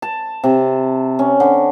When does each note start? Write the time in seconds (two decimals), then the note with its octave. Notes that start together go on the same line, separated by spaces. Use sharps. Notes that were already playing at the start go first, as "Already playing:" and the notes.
0.02 A5
0.44 C3
1.19 C#4
1.40 D3